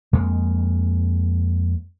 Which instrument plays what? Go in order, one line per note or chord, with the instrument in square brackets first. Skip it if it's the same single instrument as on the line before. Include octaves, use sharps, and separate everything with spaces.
[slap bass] F2 G#3 A#3